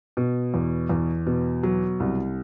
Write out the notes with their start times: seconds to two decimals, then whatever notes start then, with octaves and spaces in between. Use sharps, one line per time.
0.17 B2
0.54 E2
0.89 E2
1.26 B2
1.63 F#3
2.00 C2